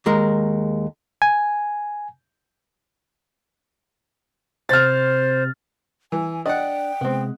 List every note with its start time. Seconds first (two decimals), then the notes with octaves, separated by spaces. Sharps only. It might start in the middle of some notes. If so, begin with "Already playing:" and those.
0.06 D#2 G#3 A#4
1.22 G#5
4.69 C3 C5 F6 A6
6.12 E3 G#5
6.46 D4 D#5 F#5 G5
7.01 C3 G#3 B3 C4